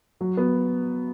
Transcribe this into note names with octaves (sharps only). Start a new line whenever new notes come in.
F#3
B3